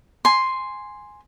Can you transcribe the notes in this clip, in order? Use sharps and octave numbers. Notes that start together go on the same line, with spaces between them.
G#5 C6